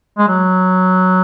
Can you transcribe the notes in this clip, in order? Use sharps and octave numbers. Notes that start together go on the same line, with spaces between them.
G#3
F#3